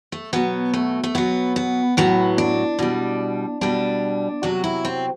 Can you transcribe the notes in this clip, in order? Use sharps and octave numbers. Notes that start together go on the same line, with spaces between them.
A3
B2 F#3 B3
A3
A3
B2 F#3 B3
B3
A2 F#3 B3
D4
B2 G3
B2 G3 D4
C3 F#3 F#4
E4
C4